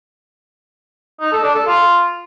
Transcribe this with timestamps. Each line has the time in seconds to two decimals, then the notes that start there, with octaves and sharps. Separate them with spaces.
1.20 D#4
1.32 A4
1.44 D4
1.55 A4
1.67 F4